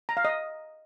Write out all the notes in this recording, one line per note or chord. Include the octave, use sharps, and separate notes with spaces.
A#5
F5
D#5